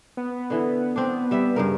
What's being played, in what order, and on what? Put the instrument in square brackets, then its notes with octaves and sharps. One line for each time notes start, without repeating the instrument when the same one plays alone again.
[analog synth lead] B3
[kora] D3 E3
C4 D4
G3 E5
G2 C#3 A#4